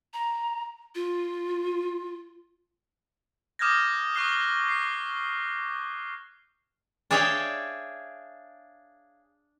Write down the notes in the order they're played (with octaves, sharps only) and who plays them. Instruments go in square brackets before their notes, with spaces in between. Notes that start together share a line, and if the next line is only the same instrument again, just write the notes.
[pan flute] A#5
F4
[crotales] D6 D#6 F6 G6 G#6 A#6
C#6 D#6 F#6 C7 G7
C7
[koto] D4 G#4 C#5 E5 F5 G5